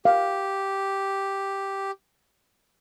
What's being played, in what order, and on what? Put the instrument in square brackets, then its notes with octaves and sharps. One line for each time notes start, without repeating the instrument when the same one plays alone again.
[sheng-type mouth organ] G4 [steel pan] F5